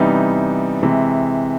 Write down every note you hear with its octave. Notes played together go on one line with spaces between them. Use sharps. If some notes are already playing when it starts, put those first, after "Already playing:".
Already playing: C3 E3 G3 B3 D#4
C3 E3 G#3